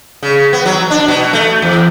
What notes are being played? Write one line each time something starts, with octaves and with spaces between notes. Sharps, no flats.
C#3
B3
F#3
D4
B2
A3
E2